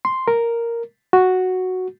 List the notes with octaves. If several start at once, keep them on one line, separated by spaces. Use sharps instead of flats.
C6
A#4
F#4